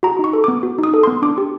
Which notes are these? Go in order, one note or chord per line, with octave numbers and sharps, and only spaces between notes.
F#4 A#5
D#4 C#6
A4
B3 D6
F#4
D#4
D#6
A4
B3 C6
D4 D6
G4